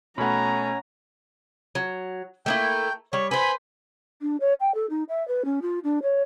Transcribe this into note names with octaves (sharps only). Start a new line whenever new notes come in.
B2 A3 C#4 F#5 A#5 B5
F#3
A3 A#3 E4 G5
G3 C#5
B4 C5 G#5 B5
D4
C#5
G5
A4
D#4
E5
B4
C#4
F4
D4
C#5